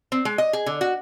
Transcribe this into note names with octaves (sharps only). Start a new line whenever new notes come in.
C4
G#3
D#5
G#4
D3
F#4